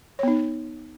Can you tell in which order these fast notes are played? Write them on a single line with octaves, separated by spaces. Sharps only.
C#5 B3 D#4